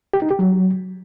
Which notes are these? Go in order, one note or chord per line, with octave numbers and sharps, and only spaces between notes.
G4
D#4
G4
F#3